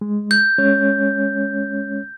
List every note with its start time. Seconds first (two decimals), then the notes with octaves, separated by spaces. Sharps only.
0.01 G#3
0.31 G6
0.58 G#3 C#4 C#5